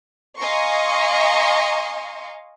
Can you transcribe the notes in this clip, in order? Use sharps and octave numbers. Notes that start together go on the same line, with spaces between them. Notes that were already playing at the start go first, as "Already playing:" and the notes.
D#5 F5 G#5 A#5 C6 C#6